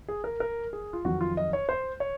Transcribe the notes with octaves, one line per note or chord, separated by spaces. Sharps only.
G#4
A#4
A#4
G#4
F4
F2 D#3 F#3 F#4
F4
D#5
C#5
C5
C#5